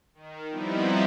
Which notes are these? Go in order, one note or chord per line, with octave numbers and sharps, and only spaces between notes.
D#3
F3 G3 B3 C4 D#4 E4